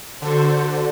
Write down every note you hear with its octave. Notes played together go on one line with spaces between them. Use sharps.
D3 F#4 A4 C5